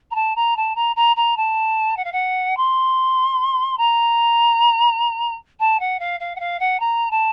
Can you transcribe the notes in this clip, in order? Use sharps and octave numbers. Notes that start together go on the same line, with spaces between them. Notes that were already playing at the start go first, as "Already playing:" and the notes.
A#5
A5
A#5
A5
A#5
A#5
A#5
A5
F#5
F5
F#5
C6
A#5
A5
F#5
F5
F5
F#5
F5
F#5
A#5
A5